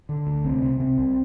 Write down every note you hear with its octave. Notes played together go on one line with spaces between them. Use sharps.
D3
D2
C2 C4
C3
C3 C4
C2